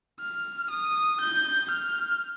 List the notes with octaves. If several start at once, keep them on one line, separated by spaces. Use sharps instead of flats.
F6
D#6
G6
F6